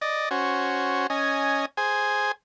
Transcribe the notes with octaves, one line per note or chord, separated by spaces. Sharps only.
D5 D#5
C#4 F#4 C5
C#4 D#5 G#5
G#4 C5 G#5